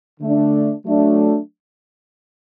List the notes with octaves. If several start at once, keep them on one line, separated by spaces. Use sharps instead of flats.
D3 A3 D4
F#3 A3 D4